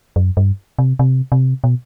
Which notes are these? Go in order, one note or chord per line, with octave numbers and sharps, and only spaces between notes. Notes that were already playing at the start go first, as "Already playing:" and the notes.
F#2
G2
C3
C3
C3
B2